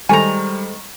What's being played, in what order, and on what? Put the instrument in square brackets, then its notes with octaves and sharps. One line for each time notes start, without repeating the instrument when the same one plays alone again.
[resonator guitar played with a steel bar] D#3 A#5 [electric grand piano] G3 [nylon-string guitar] G#3 A4 C5 [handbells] G#5